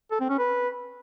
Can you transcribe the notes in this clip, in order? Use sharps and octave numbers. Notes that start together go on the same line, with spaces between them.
A4
C4
C#4
B4